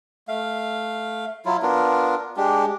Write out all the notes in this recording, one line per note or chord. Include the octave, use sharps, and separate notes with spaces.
A3 F5
F#3 E4 F4
B3 D4 F4 A#4
G#3 D4 G4